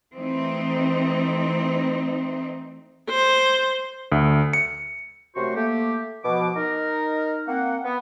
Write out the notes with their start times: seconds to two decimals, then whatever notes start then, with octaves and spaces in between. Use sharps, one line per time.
0.15 E3 A3 C4 D#4
3.09 C5
4.12 D2
4.53 C#7
5.35 F#2 C3 A3 F#4 C5 C#6
5.56 A3 A#3 G4
6.24 B2 F3 D6
6.56 D#4 A#4
7.48 A#3 C4 F#5
7.85 B3